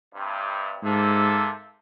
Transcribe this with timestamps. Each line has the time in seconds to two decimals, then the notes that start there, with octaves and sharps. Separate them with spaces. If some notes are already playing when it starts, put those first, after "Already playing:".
0.13 G2 C3
0.83 G#2 C3 A#3 A4